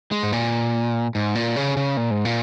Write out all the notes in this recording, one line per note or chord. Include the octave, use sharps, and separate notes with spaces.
G#3
G#2
A#2
G#2
A#2
C#3
C#3
A#2
G#2
A#2